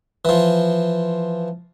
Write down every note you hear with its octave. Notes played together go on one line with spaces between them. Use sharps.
E3 F3